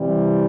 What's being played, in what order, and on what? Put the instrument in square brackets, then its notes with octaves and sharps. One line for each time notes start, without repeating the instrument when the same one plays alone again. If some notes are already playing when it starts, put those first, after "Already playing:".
Already playing: [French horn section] C3 E3 G3